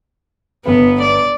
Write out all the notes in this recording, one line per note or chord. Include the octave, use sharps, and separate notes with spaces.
G1 B3 B4
D5